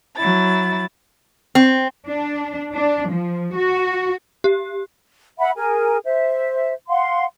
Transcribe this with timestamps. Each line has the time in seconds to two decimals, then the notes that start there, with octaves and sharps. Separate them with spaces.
0.16 F#3 E4 A6
1.55 C4
2.08 D4
2.72 D4
3.10 F3
3.54 F#4
4.44 G4
5.39 E5 F#5 B5
5.56 G#4 A#4 G#5
6.04 C5 E5
6.88 F5 F#5 C6